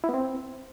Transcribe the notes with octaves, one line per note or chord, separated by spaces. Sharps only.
E4
B3
C4